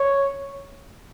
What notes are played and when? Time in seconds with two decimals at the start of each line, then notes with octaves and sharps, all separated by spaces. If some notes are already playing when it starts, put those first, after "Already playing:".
Already playing: C#5